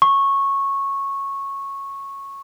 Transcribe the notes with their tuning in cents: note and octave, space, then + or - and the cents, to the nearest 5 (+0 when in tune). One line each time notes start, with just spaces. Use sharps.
C#6 -10